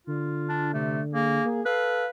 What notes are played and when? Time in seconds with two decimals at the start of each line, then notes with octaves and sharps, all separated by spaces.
0.07 D3 F4
0.49 D4
0.74 C3 A3
1.13 A#3 G#4
1.45 A#3
1.66 A4 B4 F5